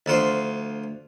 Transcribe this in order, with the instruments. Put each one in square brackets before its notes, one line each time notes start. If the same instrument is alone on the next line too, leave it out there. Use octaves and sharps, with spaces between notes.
[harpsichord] D2 F3 C5